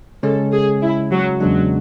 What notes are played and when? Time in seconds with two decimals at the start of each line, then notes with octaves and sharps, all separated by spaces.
0.23 C#3 G#3 C#4 A4
0.52 G#4
0.82 E4
1.12 F#3
1.40 E2 C#3 F#3 G#3 B3 D4